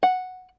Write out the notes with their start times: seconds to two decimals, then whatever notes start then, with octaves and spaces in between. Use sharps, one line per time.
0.03 F#5